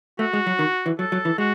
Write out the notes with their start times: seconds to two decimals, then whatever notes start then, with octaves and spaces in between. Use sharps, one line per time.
0.19 A3 F#4
0.33 G#3
0.47 F#3
0.59 D#3
0.86 E3
0.99 F#3 A4
1.12 F#3
1.25 E3
1.38 G#3 F#4